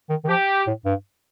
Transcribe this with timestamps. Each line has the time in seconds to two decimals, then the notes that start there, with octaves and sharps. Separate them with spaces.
0.10 D#3
0.24 D#3
0.29 F3 G4
0.67 A2
0.85 G2